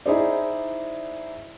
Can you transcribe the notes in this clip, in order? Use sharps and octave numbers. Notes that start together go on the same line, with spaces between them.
D#4 E4 G#4 C5 D5